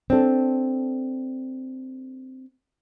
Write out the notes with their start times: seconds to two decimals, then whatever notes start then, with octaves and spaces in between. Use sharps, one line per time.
0.10 C4 D4 A4